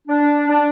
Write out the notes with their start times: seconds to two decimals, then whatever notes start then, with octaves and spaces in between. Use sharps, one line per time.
0.08 D4
0.48 D4